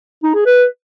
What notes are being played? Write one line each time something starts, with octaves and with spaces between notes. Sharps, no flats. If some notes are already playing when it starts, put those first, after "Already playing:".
D#4
G#4
B4